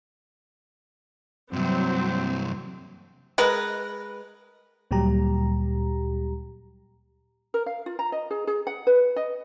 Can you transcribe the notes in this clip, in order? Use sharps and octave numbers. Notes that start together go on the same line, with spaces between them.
G2 C3 F#3 C4
G#3 A#4 B4
D2 A#2 F#3 G3 G4 A#5
A#4
F5
F4
A#5
D#5
G#4
G#4
F#5
B4
D#5